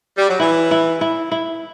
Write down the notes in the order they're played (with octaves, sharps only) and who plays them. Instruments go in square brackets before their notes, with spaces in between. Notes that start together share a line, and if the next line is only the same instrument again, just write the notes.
[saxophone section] G3
F#3
[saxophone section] E3 [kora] E4
[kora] E4
E4
E4